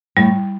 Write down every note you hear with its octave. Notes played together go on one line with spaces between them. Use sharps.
A2 G3